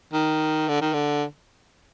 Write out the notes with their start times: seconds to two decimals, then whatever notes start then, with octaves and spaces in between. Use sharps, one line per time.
0.13 D#3
0.68 D3
0.81 D#3
0.93 D3